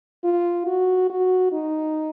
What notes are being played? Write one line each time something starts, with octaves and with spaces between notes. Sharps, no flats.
F4
F#4
F#4
D#4